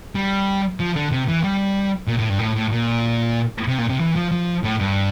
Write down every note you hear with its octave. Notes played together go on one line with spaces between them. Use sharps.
G3
F3
D3
C3
E3
G3
A#2
A2
G2
A2
A2
A#2
C3
A#2
C3
E3
F3
F3
A2
G2